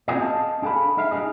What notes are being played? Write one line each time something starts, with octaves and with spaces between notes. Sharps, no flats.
C4 C#4 F4 F#4 G#4 D5
D#5 F5 A5
D4 G#4 A4 F5 B5
D#4 E5 F5
D4 D#4 G4 G#4 D#5